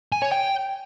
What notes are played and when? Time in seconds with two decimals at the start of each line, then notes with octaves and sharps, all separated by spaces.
0.12 G#5
0.22 C#5
0.31 G5